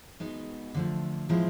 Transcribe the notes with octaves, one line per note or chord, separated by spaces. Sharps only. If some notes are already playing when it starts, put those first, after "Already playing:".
G#3 B3 D#4 F#4
D3 F3 A3
A2 F3 G#3 C4 E4